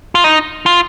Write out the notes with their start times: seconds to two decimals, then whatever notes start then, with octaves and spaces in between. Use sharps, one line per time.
0.15 F4
0.24 D#4
0.66 F4